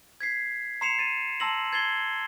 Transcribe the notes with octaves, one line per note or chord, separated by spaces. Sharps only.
G#6 B6 C7
A#5 C6 C7 C#7 E7 F7
A6 D#7
A5 A#5 C6 E6 A#6 F#7
G#6 A6 C7 G7